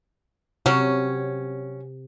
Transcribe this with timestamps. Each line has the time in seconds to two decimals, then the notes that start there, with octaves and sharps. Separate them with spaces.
0.66 C3 F#3 C#4